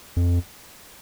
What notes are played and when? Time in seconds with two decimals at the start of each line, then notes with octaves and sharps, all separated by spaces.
0.16 F2